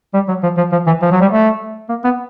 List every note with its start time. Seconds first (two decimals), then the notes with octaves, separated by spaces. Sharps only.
0.14 G3
0.28 F#3
0.43 F3
0.57 F3
0.72 F3
0.87 E3
1.02 F3
1.12 F#3
1.21 G3
1.32 A3
1.89 A#3
2.04 B3